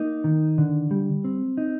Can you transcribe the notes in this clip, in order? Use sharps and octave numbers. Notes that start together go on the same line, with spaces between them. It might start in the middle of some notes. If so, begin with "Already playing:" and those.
Already playing: A#3 D#4
D#3
D3
G3
C4
D#4